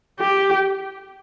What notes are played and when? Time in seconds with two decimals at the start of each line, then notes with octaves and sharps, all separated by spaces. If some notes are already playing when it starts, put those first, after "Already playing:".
0.20 G4